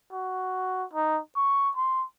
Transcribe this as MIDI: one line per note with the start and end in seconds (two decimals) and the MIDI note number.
0.13 0.84 66
0.93 1.19 63
1.36 1.71 85
1.76 2.04 84